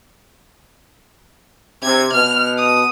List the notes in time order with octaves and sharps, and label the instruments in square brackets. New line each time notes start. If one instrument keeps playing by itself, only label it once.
[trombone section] C3 [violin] G#6
[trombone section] B2 [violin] F6
[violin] D#6